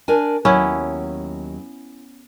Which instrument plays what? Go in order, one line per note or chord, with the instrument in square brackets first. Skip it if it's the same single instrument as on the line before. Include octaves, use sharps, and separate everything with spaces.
[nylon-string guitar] D4 A#4 G#5
[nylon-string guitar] D#2 F#3 [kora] B3 C#4 E4